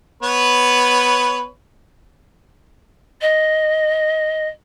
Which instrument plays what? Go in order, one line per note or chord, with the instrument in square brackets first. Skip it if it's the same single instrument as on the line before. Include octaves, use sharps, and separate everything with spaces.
[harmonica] B3 B4 C#5
[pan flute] D#5